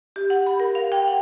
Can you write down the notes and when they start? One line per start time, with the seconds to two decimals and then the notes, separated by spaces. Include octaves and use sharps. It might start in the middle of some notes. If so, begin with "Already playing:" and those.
0.16 G4
0.30 F#5
0.46 B5
0.60 A#4
0.75 F5
0.92 G5
1.08 F#5